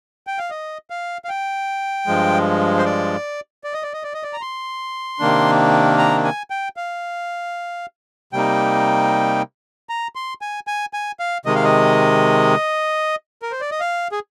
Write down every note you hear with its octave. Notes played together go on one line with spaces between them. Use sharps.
G5
F5
D#5
F5
F5
G5
G2 F3 G#3
C5
D5
D5
D#5
D5
D#5
D5
D#5
D5
A#5
C6
C3 D#3 A#3 D4
A#5
G#5
G5
F5
C3 G3 A#3 D#4 G5
A#5
C6
G#5
G#5
G#5
F5
C3 D#3 G#3 D#5
F5
D#5
A#4
C5
D5
D#5
F5
G#4